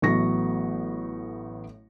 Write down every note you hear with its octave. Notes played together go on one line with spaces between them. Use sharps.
A1 A2 F#3 B3 C#6 A#6